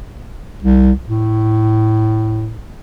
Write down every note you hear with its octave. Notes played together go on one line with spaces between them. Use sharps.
C2
A2